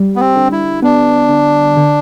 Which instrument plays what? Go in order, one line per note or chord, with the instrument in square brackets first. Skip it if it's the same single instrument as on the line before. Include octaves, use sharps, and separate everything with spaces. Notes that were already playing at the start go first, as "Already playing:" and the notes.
Already playing: [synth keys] G3
[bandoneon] B3
C4
[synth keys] D3
[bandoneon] E4
[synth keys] B3 [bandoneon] D4
[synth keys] D3
D3